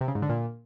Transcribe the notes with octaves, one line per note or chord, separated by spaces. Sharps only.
C3
C#3
G#2
D3
A#2